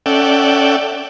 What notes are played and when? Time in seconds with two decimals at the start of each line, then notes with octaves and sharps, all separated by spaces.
0.06 C#4 A4 D5 E5 F#5 G5